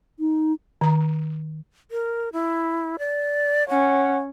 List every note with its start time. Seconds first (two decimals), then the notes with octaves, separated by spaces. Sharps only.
0.20 D#4
0.81 D#3 A#5
1.91 A#4
2.33 E4
2.99 D5
3.69 C#4 F#5